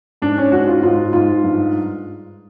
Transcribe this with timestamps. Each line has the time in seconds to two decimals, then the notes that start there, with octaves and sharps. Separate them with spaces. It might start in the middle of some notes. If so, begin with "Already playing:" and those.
0.22 G#2 D4
0.38 C#4
0.52 G#2 F#4
0.67 F4
0.83 G#2 F4
1.13 G#2 F4
1.44 G2